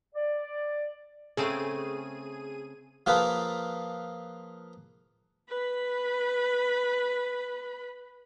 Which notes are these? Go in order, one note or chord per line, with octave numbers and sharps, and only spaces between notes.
D5
C#3 A3 C4 G#4 D#7
F3 A#3 F4 G#4 A4 B4
B4 B5